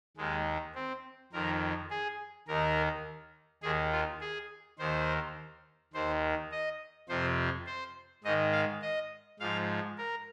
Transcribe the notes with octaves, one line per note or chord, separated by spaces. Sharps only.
D#2 D#3 G#3
C4
F2 D#3 A#4
G#4
D#2 D#3 A#4
D#2 D#3 G#4
F4
G#4
D#2 D#3 C5
D#2 D#3 C5
D#5
F2 C3 F3 C5
C5
G#2 D#3 D#5
F5
D#5
G#2 F3 F5
A#4